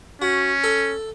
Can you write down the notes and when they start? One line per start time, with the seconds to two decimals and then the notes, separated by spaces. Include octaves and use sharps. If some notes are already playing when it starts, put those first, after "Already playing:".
0.22 C#4 F#4
0.64 A4